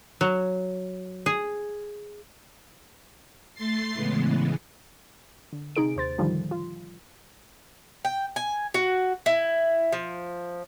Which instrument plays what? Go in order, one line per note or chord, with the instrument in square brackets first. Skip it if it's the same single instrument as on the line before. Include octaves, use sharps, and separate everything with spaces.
[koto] F#3
G#4
[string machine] A3 C6 A6 C7
A2 C#3 E3 G#3 B3
[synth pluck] D3
C3 D#4 G#4 D7
D#2 C5 A6
A2 D3 D#3 F3 G3
F4
[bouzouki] G5
G#5
F#4
E4
F3